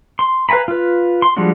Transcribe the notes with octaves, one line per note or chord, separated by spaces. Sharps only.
C6
B4 F5 G#5 A#5 B5
F4 B4
C6
F3 G3 G#3 D4 F#4